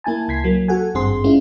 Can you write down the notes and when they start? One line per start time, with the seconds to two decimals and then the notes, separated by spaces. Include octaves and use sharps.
0.04 A#3 E4 G#5 A5
0.28 C#2 G#6 B6 C7
0.44 F#3 A#3
0.68 F#4 A4 F#5 G#5
0.95 G#1 G2 C4 G#4 C6
1.24 G#3 C#4 E4 F4